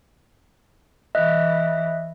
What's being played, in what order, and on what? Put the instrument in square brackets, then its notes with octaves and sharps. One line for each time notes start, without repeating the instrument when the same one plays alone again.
[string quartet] E3 [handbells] D#5 E5 F#6